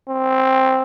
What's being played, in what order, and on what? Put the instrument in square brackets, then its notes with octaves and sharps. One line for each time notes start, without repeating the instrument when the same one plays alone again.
[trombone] C4